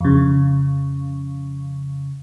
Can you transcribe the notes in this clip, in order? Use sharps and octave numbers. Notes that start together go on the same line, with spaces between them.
F2 C#3